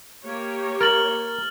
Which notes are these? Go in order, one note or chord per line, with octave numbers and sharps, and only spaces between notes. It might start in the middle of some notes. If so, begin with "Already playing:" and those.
A#3 G4 C#5
A#4 F6 A6 F#7